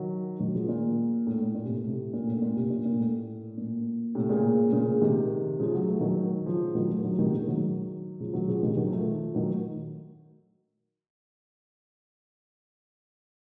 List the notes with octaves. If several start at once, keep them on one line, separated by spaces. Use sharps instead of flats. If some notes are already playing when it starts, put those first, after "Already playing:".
Already playing: D#3 F#3
D#3 F#3
C#3 F3
A#2
A2
A2
A#2
A2 C3
A2 C3
A#2
A2
A#2
A2 C3
A#2
A#2
A2
A#2
A2 C3
A#2 C#3
A#2 C#3
C3 D#3
C#3 F3
F#3
A3
D#3 F#3
C#3 F3
D#3 F#3
F3 A3
D#3 F#3
C3 D#3
A#2 C#3
D#3 F#3
C#3 F3
D#3 F#3
C#3 F3
C3 D#3
D#3 F#3
F3 A3
D#3 F#3